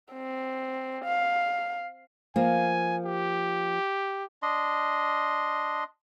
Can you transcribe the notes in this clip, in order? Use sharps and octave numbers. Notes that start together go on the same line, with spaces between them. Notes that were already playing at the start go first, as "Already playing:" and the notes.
C4
F5
F3 A#3 G#5
G4
D4 D#5 C6